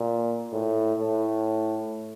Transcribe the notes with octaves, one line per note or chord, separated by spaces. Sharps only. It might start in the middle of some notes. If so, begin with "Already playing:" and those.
Already playing: A#2
A2
A2